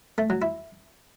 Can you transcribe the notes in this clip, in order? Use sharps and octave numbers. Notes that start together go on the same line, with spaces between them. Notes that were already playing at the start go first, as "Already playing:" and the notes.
A3
F#3
E4